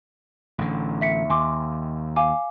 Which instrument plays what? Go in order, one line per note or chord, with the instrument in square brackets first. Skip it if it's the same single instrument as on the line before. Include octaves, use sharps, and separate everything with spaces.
[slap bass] A1 D3
[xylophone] E5 B6 C#7
[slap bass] D#2 [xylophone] G#5 C6 D6
[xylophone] F5 G#5 D6